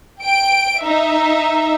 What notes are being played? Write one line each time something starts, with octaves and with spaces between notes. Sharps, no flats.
G5 D7
D#4 E5